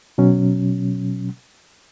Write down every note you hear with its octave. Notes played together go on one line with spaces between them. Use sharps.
B2 F#3 C#4